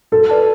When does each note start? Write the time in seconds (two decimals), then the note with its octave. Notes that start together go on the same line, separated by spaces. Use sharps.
0.12 F#4 A4
0.30 B4 D5 A5